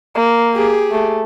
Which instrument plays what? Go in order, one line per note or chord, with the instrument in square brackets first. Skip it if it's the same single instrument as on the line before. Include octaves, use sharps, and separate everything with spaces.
[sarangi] A#3
[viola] G4 G#4
[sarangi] A3